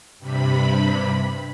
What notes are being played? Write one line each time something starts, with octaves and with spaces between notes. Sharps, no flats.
G2 C3 B5